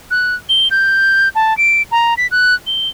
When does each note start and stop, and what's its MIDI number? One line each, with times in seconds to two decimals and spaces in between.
0.11 0.35 90
0.49 0.68 103
0.71 1.29 91
1.35 1.56 81
1.57 1.82 98
1.91 2.14 82
2.17 2.27 95
2.31 2.54 90
2.67 2.88 103